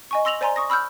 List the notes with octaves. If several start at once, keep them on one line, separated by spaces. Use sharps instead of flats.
D#5 G#5 C#6
C6 E6 A#6 F7 F#7
C5 D5 G#5 A#5 C6
C#6 D#6 A#6
B5 E6 F6 G6